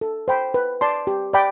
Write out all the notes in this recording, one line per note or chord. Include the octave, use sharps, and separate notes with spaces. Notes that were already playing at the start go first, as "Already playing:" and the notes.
A4
C5 G5 B5
B4
D5 A5 C6
G4
D5 G5 B5